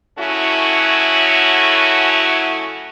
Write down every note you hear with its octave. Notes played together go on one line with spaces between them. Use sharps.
C#3 F#3 A3 C#4 E4 F#4